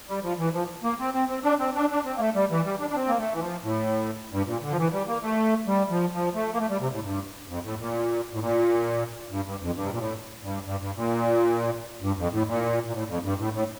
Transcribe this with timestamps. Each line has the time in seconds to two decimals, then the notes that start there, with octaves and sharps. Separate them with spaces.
0.09 G3
0.23 F3
0.39 E3
0.53 F3
0.83 A#3
1.00 C4
1.14 C4
1.29 C4
1.44 D4
1.60 C4
1.75 D4
1.90 D4
2.05 C4
2.16 A#3
2.19 A3
2.35 G3
2.51 E3
2.65 G3
2.80 D4
2.90 D4
2.95 C4
3.08 A#3
3.18 A3
3.33 E3
3.40 F3
3.63 A2
4.32 G2
4.47 A#2
4.62 D3
4.70 F3
4.77 E3
4.92 G3
5.08 A#3
5.23 A3
5.67 G3
5.90 F3
6.13 F3
6.35 A3
6.53 A#3
6.59 A3
6.69 G3
6.80 C3
6.92 A2
7.04 G2
7.49 F2
7.64 A2
7.79 A#2
8.33 A2
8.40 A#2
9.31 G2
9.45 G2
9.61 F2
9.75 G2
9.83 C3
9.91 A#2
9.98 A2
10.43 G2
10.66 G2
10.81 G2
10.96 A#2
12.02 G2
12.18 F2
12.32 A2
12.47 A#2
12.88 A#2
12.93 A2
13.08 F2
13.24 G2
13.39 A2
13.53 A2